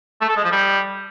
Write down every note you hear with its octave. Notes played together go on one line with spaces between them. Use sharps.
A3
A4
G#3
F3
G3